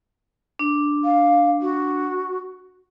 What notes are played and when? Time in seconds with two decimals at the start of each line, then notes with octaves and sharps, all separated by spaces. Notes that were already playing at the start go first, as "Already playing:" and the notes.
0.59 D4
1.04 F5
1.61 F#4